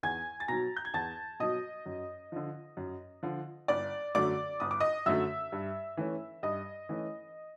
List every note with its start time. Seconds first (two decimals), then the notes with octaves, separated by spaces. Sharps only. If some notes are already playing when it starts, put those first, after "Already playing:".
0.03 E2 G#5 G#6
0.40 A6
0.48 B2 F#3 A#5 A#6
0.77 G6
0.85 G#6
0.94 E2 A5 A6
1.40 B2 F#3 D#5 D#6
1.86 F#2
2.32 D3 F3
2.77 F#2
3.23 D3 F3
3.68 G1 D5 D6
4.15 F#2 D3 F#3 A3 D5 D6
4.60 G1 D#6
4.71 D6
4.80 D#5 D#6
5.06 F#2 D3 F#3 A3 E5 E6
5.52 G2
5.97 E3 A3 C#4
6.43 G2 D#5 D#6
6.89 E3 A3 C#4